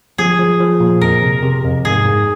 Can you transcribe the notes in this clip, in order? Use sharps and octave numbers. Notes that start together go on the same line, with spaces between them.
F3 G#4
F3
F3
A#2
F2 A#4
C3
C3
F2
G#2 G#4
G#2